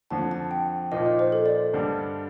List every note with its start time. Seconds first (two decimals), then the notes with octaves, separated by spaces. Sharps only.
0.10 F2 D3 F3 A5
0.31 A5
0.51 G5
0.92 A#2 F3 A#3 D#4 D#5
1.06 D#5
1.19 C5
1.32 A4
1.46 D5
1.73 G2 D3 G3 D4